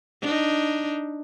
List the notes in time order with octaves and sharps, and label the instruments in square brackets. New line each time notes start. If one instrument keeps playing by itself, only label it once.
[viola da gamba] D4 D#4